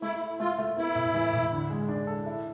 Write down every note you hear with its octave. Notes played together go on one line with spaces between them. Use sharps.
A3 E4
E4
A3 F4
A3
B3 E4
A2
E3
A2
D3
G#3
D4
A4
E4